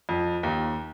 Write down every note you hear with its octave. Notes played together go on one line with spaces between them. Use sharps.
F2
D#2